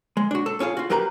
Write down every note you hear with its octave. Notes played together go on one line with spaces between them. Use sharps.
G#3
D4 F#4
A4
C#4 F4 G#4 F5
F4 F#4
F#3 G4 A#4 B4 F5 A#5